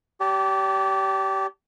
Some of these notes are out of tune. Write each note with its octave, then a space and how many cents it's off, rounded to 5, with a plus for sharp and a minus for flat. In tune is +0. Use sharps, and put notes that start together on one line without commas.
G4 -20 D5 -45 A5 +0